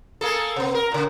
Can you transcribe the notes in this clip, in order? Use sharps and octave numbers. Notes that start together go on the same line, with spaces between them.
A#3 G#4 A4
C3 B3
A#4
A#2 C#3